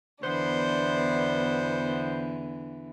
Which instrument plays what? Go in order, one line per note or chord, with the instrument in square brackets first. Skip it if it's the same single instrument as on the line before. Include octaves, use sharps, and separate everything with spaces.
[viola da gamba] E2 D3 E3 [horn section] B3 C5 [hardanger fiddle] D4